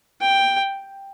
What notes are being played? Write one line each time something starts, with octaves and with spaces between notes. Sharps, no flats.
G5